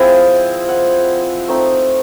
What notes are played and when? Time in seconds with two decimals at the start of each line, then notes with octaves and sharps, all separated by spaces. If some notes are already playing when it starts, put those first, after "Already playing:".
Already playing: F3 G#3 C4 E4 D#5
0.68 F#5
1.48 A3 C4 D#4